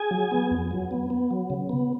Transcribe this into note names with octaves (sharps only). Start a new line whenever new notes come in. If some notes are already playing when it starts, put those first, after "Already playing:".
Already playing: G#4 G#5
F#3
B3
F2
F#3
B3
B3
F#3
C#3
B3